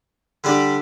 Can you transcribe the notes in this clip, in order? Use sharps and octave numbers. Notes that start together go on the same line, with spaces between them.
D3 G3 D4 G4 D5